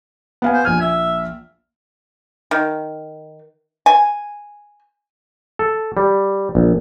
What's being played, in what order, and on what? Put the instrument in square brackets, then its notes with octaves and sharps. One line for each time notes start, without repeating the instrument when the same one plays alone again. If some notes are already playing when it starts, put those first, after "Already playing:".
[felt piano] B3 F5 G#5
[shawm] C5
[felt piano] A#1 F6 [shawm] G#5
[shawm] E5
[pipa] D#3
G#5
[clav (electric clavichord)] A4
G3
A#1